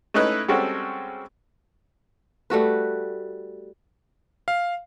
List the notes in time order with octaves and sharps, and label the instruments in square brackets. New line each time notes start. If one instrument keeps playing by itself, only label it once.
[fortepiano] A3 C#4 D#4 E4 B4 D#5
G3 G#3 C4 C#4 F#4 A4
[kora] G3 A3 F#4 B4
[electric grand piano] F5